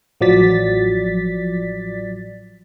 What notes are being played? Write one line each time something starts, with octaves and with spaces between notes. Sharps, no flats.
A1 F3 F#3 D5 A6 B6